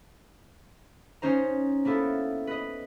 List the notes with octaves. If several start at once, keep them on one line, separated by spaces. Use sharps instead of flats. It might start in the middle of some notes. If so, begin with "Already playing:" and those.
C#4 D#4 C5 A#5
A#3 B3 E4 A4
B4 D#5